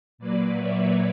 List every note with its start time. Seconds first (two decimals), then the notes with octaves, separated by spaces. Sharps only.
0.18 A#2 F#3 A#3 B4 D5
0.58 C#5 E5